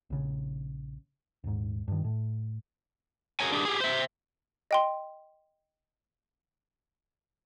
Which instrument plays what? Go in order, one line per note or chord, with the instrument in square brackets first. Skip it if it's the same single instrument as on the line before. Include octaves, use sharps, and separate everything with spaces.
[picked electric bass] A#1 C#3
D#1 G#2
G2 D#3
A2
[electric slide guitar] F#4 G#4 A#4 C#5 G#5
D4 G4 G#4
G4 G#4
C5 E5
[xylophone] D#5 G5 C6